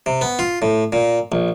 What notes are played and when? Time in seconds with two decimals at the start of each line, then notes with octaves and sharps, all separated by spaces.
0.06 C3
0.21 B3
0.39 F4
0.62 A2
0.92 A#2
1.32 A#1